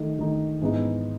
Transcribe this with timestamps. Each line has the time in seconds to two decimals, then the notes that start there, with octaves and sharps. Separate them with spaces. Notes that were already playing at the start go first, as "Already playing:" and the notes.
Already playing: D#3 A3 D#4
0.19 D#3 A3 D#4
0.61 G#2 E3 B3 D#4